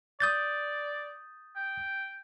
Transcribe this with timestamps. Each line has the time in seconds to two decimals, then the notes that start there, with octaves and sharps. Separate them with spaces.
0.20 D5 D#6 G6 A6
1.56 G5